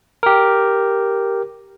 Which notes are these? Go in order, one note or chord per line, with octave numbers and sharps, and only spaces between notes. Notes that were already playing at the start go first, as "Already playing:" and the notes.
G4 A#4